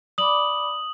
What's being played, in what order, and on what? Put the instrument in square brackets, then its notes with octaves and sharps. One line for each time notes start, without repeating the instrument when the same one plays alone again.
[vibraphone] D5 B5 D6 [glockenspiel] D#6 F#7